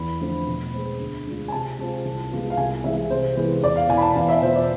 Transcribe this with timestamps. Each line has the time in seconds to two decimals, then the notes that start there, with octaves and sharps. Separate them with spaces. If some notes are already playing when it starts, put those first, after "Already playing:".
Already playing: E2 B5
0.20 D3 F3 A3 C4
0.47 B2
0.73 G#3 C4
1.00 D2
1.26 D3 G#3 D4 F4
1.48 G#5
1.52 C3 A5
1.79 G#3 C4 F4
2.05 C2
2.31 C3 G#3 B3 F4
2.50 F5
2.57 C2 G#5
2.84 C3 E3 G#3 E5
3.10 C3 C5
3.36 E3 G#3 B3
3.63 E2 D5
3.76 F5
3.89 B2 B3 E4 G#5
3.97 B5
4.02 A5
4.16 E2 F5
4.29 E5
4.42 B2 B3 F4 C5
4.55 D5